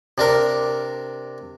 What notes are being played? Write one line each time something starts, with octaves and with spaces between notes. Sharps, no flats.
C3 D4 A#4